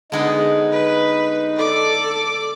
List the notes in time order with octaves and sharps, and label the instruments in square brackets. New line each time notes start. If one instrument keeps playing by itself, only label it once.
[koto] D3 G#3 B3 [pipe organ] D#4
[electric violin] B4
[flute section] A4 [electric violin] D5 D6